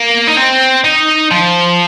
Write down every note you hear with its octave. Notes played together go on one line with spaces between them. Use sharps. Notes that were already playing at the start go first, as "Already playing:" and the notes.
Already playing: A#3
D#4
C4
D#4
F3